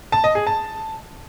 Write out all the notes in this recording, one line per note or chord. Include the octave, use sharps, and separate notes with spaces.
A5
D#5
G#4
A5